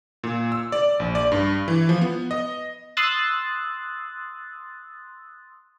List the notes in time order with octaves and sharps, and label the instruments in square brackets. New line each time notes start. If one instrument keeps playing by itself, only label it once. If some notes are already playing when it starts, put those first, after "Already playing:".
[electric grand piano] A#2
E6
D5
A#1
D5
G2
E3
F3
B3
D#5
[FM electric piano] C6 D#6 E6 F#6 A6